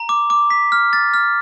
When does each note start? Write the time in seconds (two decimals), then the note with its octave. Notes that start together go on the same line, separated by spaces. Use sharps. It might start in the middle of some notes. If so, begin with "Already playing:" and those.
Already playing: A#5
0.09 D6
0.30 D6
0.50 B6
0.72 F6
0.93 A6
1.14 F6